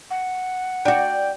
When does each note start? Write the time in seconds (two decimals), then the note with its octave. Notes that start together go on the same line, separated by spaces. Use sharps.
0.11 F#5
0.85 D4 F#4 D5 G5